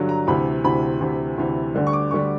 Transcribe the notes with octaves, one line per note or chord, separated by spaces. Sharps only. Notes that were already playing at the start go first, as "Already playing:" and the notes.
Already playing: G2 D3 F#3
A#5
D2 C3 E3 B5
D2 C3 E3 B5
D2 C3 E3
D2 C3 E3
D2 D3 G3
C#6
D6
D2 D3 G3 C#6